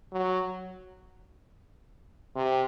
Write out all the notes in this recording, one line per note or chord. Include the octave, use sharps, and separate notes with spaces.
F#3
C3